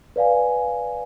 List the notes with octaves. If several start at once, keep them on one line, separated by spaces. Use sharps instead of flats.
B4 D5 F5 G#5